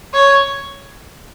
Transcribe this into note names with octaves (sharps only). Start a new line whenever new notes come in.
C#5